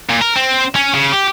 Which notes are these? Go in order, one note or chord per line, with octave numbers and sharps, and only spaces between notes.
A#2
A#4
C4
C#4
C#3
G4